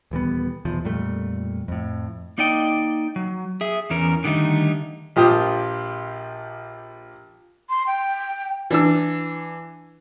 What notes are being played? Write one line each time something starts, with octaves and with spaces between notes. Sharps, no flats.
D#1 E3 G3 B3
F1 B1 E2 F3
F2 A#2 G3 A3
F2 A2
A#3 D#4 D5 D#5 G5
F#3
G#4 E5
E2 E3 C#4 A#4
D3 D#3 G3 A3 D#4
A#1 F3 F4 G4 D#6
C6
G5
E3 D4 E6